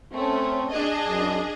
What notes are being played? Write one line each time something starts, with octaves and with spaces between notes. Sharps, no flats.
A3 C4 C#4
D4 G#4 D#5
F#2